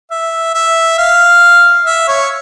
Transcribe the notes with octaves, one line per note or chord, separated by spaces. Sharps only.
E5
E5
F5
E5
C#5